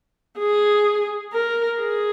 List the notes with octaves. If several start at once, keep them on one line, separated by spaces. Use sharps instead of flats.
G#4
A#4
G#4